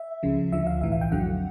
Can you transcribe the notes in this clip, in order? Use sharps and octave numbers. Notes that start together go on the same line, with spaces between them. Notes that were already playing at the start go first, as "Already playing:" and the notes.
Already playing: E5
C#2 C#3 F3
D2 D3 F3 E5
F5
B1 A2 E3 E5
F5
G5
F2 D3 F#3 F#5